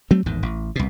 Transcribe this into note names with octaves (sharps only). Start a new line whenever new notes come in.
F#3 A3 C4
A1 E2 G#2 D#3
A1
C2 B2